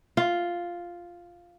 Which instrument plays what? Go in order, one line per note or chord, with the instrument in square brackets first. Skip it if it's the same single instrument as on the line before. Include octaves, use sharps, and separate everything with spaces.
[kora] F4